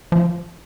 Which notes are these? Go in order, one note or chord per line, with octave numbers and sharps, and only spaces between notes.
F3